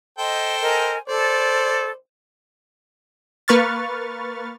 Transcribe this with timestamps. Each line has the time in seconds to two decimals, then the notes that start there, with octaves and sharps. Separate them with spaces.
0.18 A4 C5 D#5 G5
0.61 A#4 D#5 G#5
1.08 A4 C5 D5
3.48 A#3 B4 C#6 F6 A6